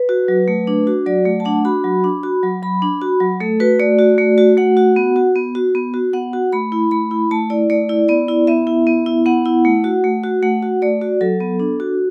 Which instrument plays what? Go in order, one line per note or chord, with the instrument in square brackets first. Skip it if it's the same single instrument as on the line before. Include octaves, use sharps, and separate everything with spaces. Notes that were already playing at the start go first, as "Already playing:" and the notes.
Already playing: [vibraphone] B4
F#4
F#3
A3
D4
F#4
F#3 D5
A3
A5
D4 F#5
F#4 B5
F#3
D4
F#4
F#3
F#3 B5
D4
F#4
F#3
A3 A4
F#4 B4
A3 D5
F#4
A3
F#4
A3 F#5
F#4
B3
F#4
B3
F#4
B3
F#4
B3 F#5
F#4
A3 B5
E4
A3 B5
E4
A3 A5
E4 D5
A3 D5
E4
B3 D5
E4
B3 E5
E4
B3
E4
B3 F#5
E4
A3
F#4
A3
F#4
A3 F#5
F#4
A3 D5
F#4
F#3 A4
B3
D4
F#4